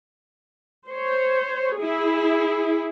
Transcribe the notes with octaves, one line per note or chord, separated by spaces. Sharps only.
C5 C#5
E4 G#4